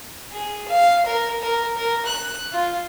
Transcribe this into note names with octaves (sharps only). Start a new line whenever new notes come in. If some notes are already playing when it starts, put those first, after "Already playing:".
G#4
F5
A#4
A#4
A#4
F#6
F4